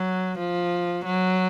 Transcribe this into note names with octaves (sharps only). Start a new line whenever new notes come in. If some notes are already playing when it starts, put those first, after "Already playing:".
Already playing: F#3
F3
F#3